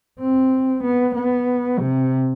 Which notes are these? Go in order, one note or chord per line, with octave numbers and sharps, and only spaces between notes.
C4
B3
B3
C3